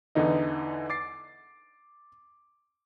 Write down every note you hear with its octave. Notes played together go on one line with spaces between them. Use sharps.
E2 D3 E3 D#4 D#5
D6 A6 C7